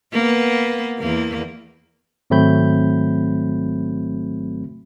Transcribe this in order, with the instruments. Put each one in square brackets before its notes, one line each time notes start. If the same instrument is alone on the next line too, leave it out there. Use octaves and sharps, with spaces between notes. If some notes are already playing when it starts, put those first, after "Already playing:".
[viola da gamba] A#3 B3
E2 A#3
[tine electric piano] G#1 F#3 A3 C4 B5 G6